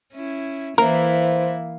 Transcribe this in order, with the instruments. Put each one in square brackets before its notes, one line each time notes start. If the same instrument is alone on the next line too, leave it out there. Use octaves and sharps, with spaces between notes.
[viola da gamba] C#4 E4
[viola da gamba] E3 E4 [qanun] A#3 [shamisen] A#4 [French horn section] C5